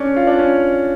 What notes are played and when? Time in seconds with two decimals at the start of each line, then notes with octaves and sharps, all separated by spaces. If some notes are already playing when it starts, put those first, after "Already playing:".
Already playing: C#4 D4
0.16 F4
0.27 D4
0.39 C#4